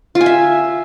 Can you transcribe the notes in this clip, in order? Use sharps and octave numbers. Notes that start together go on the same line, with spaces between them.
F4
G#5
E5